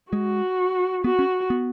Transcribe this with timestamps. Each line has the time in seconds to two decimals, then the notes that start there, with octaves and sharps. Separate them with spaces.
0.12 G#3 F#4
1.04 B3 F#4
1.19 C#4
1.50 B3